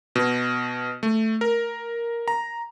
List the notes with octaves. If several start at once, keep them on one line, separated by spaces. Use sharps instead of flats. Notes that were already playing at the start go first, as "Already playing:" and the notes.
B2
A3
A#4
A#5